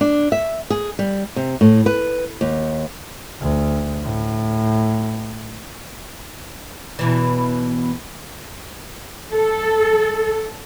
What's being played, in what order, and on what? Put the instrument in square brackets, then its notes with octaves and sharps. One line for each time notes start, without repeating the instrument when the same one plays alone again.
[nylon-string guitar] D4
E5
G#4
G3
C3
A2
B4
D#2
[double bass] D2
A2
[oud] E2 B2 E3
[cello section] A4